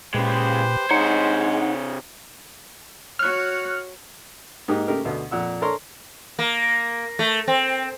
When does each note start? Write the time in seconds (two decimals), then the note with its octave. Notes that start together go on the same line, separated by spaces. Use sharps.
0.14 A#2 C#3 G#3 G4 B4 C5
0.91 C3 G#3 D#4 C#5 F#5
3.19 F#4 C#5 F6 F#6
4.68 G#2 A#3 D#4 G4 D#5
4.88 C#3 A3 G4 A#4
5.04 D2 B2 A3
5.31 F2 A#2 F#5 E6
5.61 D4 A4 A#4 C#5 A#5 C6
6.39 A#3
7.19 A3
7.48 C4